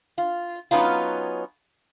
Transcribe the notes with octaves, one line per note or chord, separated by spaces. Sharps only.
F4
F#3 B3 C#4 D#4 F4